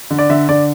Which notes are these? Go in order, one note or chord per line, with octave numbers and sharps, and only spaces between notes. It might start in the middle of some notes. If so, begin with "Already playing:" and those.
D3
D5
D3 E5
D3 D5